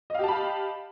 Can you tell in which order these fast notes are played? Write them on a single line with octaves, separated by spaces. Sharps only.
D#5 F5 G4 A5 B5